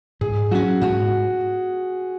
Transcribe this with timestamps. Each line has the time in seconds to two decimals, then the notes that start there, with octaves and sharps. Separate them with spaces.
0.21 G#2 G#4
0.51 F#3 C#4 F#4
0.81 G#2 F#4